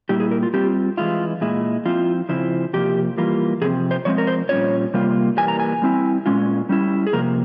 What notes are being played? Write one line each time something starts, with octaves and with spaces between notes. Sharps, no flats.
A#2 G3 A#3 E4 G4
G#4
A#4
F4
G3 C4 F4 G4
E3 G#3 E4 F4
A#2 G#3 E4
F3 C4 E4 F4
C#3 F3 C4 E4
C3 F3 A#3 G4
E3 G3 A#3 F4
C3 F3 C4 G#4
C5
F3 G#3 C4 C#5
A#4
C5
A#2 G3 C#4 F4 C#5
C3 G3 A#3 F4
E3 G3 A#3 G#5
A#5
G#5
G3 C4 E4
A#2 G#3 C#4 F4
G3 C#4 E4
G#4
C3 F3 A#3 A#4